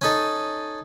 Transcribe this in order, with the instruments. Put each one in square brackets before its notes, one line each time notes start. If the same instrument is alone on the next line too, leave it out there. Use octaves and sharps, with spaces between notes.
[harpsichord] C#4 D#4 A4